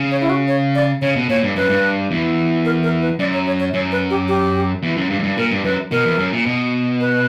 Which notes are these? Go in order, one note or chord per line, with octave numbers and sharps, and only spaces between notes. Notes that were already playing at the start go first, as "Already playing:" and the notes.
Already playing: C#3
C#5
E4
F#4
C#5
D5
C#3 C#5
B2
A#2 C#5
G2
F#2 B4
G2
E2
A#4
A#4
B4
F#2 D5
C#5
C#5
C#5
F#2 C#5
B4
G4
G4
E2
F#2
G2
F#2
G2
A#2 A#4
G2
F#2 B4
B2 A#4
E2
F#2
A#2
B2
B4